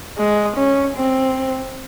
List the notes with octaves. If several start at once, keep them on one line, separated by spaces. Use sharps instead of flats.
G#3
C#4
C4